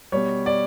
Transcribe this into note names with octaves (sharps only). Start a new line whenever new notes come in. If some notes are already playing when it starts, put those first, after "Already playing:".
B2 G3 C#5
D5